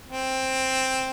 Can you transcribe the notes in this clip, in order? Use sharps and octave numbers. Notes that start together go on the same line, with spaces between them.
C4